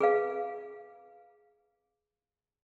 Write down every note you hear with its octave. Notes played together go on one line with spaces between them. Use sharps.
G#4 B4 F5